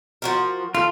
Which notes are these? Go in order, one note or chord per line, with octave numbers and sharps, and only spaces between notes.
F3 F#4 A#4
F4 A4